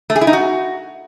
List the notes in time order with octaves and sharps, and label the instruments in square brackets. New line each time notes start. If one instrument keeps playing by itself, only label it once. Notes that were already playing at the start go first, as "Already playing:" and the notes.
[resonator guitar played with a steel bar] A3
G#4
E4
D#4
F#4